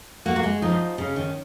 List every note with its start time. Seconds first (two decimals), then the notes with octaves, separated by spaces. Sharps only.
0.26 A#3 F#4
0.36 A#3
0.43 G#3
0.62 F3 D#4
0.98 C#3 C#4
1.16 D#3